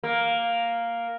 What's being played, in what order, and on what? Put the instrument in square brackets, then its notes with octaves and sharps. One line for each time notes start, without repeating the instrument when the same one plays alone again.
[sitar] A#3